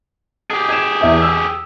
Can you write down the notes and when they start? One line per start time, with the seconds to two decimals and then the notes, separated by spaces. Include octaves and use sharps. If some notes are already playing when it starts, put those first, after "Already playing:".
0.50 G4 G#4
0.69 G#6 D#7 E7
1.01 E2 E5
1.22 E6